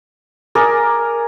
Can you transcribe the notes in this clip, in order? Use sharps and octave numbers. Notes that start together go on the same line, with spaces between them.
G#4 A#4 D5